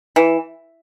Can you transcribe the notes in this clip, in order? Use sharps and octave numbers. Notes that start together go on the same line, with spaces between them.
E3